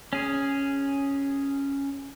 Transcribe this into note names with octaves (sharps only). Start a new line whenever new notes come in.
C#4 G#4